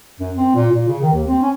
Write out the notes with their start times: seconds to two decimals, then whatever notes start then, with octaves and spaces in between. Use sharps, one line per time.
0.20 F#2
0.37 C4
0.55 A#2
0.71 A#2
0.88 C#3
1.02 D#3
1.14 D#2
1.27 C4
1.42 C#4